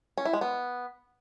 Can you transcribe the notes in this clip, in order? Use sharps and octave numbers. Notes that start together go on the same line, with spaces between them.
C#4
E4
G#3
B3